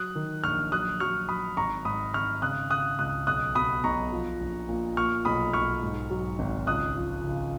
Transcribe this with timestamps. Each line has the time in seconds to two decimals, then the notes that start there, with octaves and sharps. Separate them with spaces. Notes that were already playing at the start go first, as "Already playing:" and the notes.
Already playing: F#3 D#6 F#6
0.16 D#3
0.44 A#1 C#6 F6
0.72 F#3 D#6 F#6
1.00 F#3 C#6 F6
1.29 F#3 B5 D#6
1.57 G#1 A#5 C#6
1.85 G#2 B5 D#6
2.14 G#1 C#6 F6
2.42 C#3 D#6 F#6
2.70 C#3 D#6 F#6
2.99 C#2 D#6 F#6
3.27 B1 D#6 F#6
3.55 B2 B5 D#6
3.84 B1 A#5 C#6
4.12 F3
4.41 A#1
4.69 A#2
4.97 A#2 C#6 F6
5.25 B1 B5 D#6
5.53 B1 C#6 F6
5.82 G#2
6.10 F#3
6.39 G#1
6.67 C#2 D#6 F#6
6.95 F3
7.24 C#3